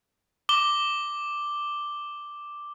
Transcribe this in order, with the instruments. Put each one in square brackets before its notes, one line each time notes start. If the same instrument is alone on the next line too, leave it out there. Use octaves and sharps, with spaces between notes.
[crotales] D6 G7